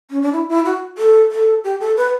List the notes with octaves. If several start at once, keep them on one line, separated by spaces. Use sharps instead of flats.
C#4
D4
E4
E4
F#4
A4
A4
G4
A4
B4